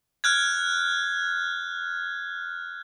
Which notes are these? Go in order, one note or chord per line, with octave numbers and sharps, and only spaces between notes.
F6 F#6 G#6